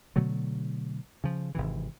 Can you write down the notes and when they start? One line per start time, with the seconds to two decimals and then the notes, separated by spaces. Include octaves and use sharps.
0.16 B2 D3 F#3 A3
1.24 C#3 F3
1.55 G#1 C3 E3